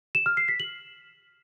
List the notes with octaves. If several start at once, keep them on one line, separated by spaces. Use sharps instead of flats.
E7
F6
C7
B6
F#7